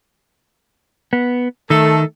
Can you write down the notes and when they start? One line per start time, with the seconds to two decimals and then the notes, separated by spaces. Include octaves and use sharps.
1.13 B3
1.70 D#3 A3 A4